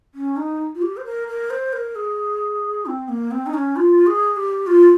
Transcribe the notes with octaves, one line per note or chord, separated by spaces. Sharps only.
C#4
D#4
F4
G4
C5
A#4
A#4
C5
A#4
G#4
C4
A#3
C4
D#4
C#4
F4
G#4
G4
F4